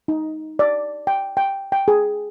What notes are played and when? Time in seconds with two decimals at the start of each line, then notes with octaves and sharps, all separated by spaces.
0.08 D#4
0.59 D5
1.07 G5
1.37 G5
1.72 G5
1.88 G#4